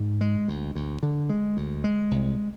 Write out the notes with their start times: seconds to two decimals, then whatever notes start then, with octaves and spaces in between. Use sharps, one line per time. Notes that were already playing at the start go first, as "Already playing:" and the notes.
Already playing: G#2
0.21 G#3
0.48 D2
0.75 D2
1.03 D3
1.29 G#3
1.57 D2
1.84 G#3
2.11 C2